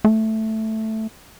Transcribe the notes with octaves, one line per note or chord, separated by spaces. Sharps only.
A3